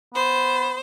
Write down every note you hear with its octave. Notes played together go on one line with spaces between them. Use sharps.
B3 C5